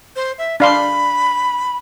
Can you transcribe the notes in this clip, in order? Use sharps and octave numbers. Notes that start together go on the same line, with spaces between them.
C5
E5
D4 F5 B5 C6